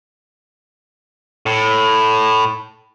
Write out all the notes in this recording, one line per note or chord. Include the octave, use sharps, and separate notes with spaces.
A2